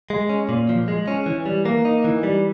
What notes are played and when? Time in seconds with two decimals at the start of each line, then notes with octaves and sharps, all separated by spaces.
0.10 G#3
0.29 C#4
0.49 A#2
0.69 F3
0.88 G#3
1.08 C#4
1.26 E3
1.46 G3
1.65 A#3
1.85 D#4
2.04 E3
2.23 G3